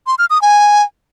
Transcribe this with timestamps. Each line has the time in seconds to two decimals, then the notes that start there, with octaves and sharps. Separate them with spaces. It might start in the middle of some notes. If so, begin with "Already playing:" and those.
0.07 C6
0.19 F6
0.30 D#6
0.42 G#5